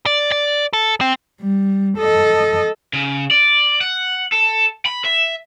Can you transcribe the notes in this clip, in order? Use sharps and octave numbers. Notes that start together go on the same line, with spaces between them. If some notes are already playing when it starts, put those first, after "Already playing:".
D5
D5
A4
C4
G3
A4 D#5
C#3
D5
F#5
A4
B5
E5